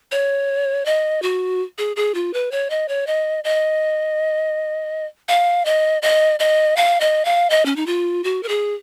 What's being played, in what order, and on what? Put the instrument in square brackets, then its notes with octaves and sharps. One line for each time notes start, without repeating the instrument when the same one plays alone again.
[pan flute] C#5
D#5
F#4
G#4
G#4
F4
B4
C#5
D#5
C#5
D#5
D#5
F5
D#5
D#5
D#5
F5
D#5
F5
D#5
C#4
D#4
F4
F#4
A#4
G#4